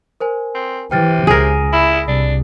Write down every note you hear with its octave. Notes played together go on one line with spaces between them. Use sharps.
A#4 C5 G#5
C4
C3 E3 G5 F6 A6
C#2 G#4 A#4 D#7
E4 B5 E6
C2 D4